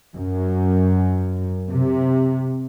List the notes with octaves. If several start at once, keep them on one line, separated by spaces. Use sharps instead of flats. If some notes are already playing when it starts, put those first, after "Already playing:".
F#2
C3